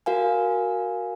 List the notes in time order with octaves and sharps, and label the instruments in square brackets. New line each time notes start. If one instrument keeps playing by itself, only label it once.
[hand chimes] F#4 A#4 F5 G#5